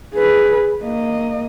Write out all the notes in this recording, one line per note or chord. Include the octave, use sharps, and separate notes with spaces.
G#4 B4
A#3 D#5